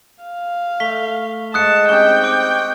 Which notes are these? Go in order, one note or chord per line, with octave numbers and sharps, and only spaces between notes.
F5
A3 B6 G7
G#2 A5 D#6 F#6 C#7
C4 C#4 D#4 G4 G5 G7
D6 D7